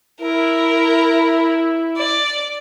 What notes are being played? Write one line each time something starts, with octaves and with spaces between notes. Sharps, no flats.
E4 A#4
D5